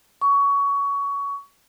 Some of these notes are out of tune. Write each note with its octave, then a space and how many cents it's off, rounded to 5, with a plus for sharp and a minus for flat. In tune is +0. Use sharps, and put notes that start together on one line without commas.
C#6 +20